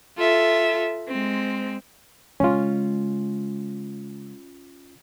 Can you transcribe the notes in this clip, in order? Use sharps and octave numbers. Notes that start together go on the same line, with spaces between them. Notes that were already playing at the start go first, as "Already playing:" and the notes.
F4 A4 E5
G#3 C4
C#3 G#3 C#4 F4